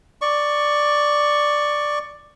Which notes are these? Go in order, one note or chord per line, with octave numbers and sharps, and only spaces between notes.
D5 C#6